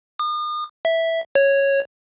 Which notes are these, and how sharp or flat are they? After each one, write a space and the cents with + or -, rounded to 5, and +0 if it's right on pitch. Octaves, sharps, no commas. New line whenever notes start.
D#6 -40
E5 -5
C#5 -5